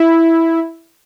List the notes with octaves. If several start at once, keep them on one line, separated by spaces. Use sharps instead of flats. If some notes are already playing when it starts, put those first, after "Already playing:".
Already playing: E4